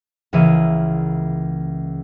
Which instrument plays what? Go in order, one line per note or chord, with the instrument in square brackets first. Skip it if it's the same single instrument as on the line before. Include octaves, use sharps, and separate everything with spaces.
[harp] C#2 C#3 E3 A#3 E5 D#7